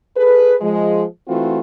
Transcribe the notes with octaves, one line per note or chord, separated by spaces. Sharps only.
G#4 A4 B4
F3 G#3
E3 A3 C4 F4 F#4